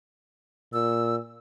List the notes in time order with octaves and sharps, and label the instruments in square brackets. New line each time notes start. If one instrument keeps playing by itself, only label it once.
[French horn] A#2 [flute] E6